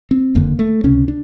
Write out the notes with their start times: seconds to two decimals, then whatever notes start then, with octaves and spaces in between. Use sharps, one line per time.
0.11 C4
0.35 F#1 F2 D3 A#3
0.59 A3
0.84 C#2 C3 C#4
1.08 D4